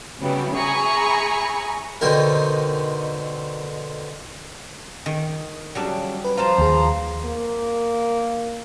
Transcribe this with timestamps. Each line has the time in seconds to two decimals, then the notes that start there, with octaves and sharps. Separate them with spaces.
0.20 C#3 F#3 G3 B3 E4
0.54 G#4 E5 G#5 A#5 B5 C#6
2.01 B2 D3 C4 D#4 A#4
5.06 D#3
5.75 C#3 F#3 G3 D4
6.25 B4
6.37 F3 F4 C5 F5 A5 A#5
6.58 D#2 G#4
7.25 A#3